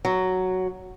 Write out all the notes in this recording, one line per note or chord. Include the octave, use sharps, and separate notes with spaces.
F#3